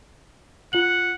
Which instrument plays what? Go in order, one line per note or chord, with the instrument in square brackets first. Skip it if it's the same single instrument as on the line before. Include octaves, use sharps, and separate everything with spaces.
[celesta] F4 F#7 [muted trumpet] F#5